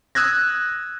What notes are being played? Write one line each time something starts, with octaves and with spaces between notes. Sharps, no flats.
D#6 E6 F#6 G#6 A#6